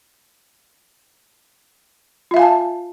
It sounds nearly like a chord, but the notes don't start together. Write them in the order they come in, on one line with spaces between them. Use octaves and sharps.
F4 E5 F5 G#5 A5